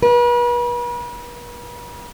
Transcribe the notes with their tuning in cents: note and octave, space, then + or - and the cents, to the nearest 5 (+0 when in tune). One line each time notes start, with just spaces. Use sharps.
B4 -40